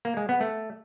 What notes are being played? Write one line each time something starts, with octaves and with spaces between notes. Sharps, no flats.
A#3
G#3
B3
A3